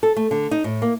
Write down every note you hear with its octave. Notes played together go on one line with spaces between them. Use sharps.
A4
A3
D3
D#4
A2
A#3